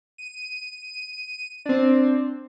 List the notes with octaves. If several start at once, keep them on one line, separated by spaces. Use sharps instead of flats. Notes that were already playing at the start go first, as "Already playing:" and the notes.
D#7
C4 D4